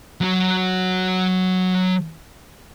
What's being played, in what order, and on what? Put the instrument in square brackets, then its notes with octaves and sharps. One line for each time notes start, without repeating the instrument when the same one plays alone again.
[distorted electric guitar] F#3 F#4